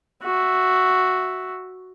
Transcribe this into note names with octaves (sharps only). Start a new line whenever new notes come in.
F#4 E5